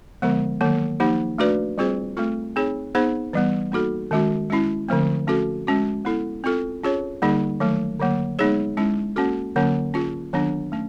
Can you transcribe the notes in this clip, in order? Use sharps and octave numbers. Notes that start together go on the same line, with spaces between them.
D3 F3 G#3 B3
D#3 F#3 A#3
F3 A#3 D#4 G4
A3 D4 F#4 B4 D5
G3 C4 F4 G#4 C5
A3 C4 F4 A4
C4 D#4 G#4 C#5
B3 D#4 G#4 C5
E3 G3 B3
A#3 D#4 F#4 A4
D#3 G#3 C#4 F#4
G#3 C#4 E4
D3 F3 A3 C4
A3 C#4 F#4 A4
G#3 C#4 F#4
B3 E4 A4
C4 F4 A4
C#4 F4 G#4 C#5
D3 G3 A#3 D#4 G#4
D#3 F#3 A3
D3 F#3 A#3
G#3 B3 D#4 G#4 C#5
G#3 C#4 E4
A#3 C#4 F#4 A4
D3 F#3 A#3 C#4
C#4 F4 G#4
D#3 F#3 B3 D4
A3 C#4